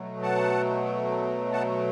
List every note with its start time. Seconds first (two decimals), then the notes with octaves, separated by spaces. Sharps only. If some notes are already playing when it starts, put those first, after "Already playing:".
Already playing: B2 F#3 A3
0.22 F#5 A5
1.53 F#5 A5